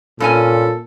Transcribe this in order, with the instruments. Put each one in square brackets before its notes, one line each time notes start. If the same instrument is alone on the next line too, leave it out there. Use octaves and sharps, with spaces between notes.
[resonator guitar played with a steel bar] G2 C#4 G#5 [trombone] A#2 [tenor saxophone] A4